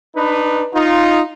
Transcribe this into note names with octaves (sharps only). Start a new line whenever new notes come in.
D4 D#4 B4
D#4 F4